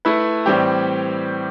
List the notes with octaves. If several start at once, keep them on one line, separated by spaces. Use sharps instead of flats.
A3 E4 B4
A2 E3 G3 C4 G4